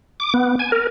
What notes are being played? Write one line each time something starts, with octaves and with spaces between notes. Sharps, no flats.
D6
B3
G#5
A#4